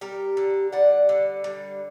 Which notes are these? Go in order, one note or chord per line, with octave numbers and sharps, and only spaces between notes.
G3 G4 A#4
D3
G3 D5 F#5
D3
G3